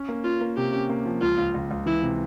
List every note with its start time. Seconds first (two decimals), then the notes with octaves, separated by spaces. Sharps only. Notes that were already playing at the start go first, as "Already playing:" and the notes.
Already playing: C#4
0.09 A#3
0.24 C#4 F4
0.41 A#3
0.57 C3 G4
0.73 C#4
0.89 A#3
1.05 F3
1.21 C#2 F4
1.38 C#2
1.54 C#2
1.71 C#2
1.86 E3 E4
2.03 C3